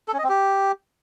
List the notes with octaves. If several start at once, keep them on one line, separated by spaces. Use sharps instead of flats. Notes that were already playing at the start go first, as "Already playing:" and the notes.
A4
C#4
D#5
C4
G4